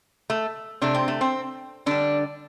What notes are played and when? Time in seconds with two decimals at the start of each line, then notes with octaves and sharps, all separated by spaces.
0.30 A3
0.82 C3 A3 D4
0.95 C4
1.08 A3
1.21 C4
1.86 D3 G3 D4